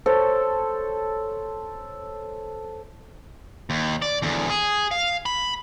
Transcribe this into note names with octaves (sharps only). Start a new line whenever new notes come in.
A4 C5 C#5
D#2
D5
E2 D3
G#4
F5
B5